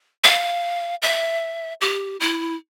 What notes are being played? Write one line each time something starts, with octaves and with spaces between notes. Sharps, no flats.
F5
E5
G4
E4